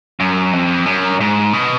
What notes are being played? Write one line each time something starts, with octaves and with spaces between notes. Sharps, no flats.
F#2
F2
F#2
G#2
B2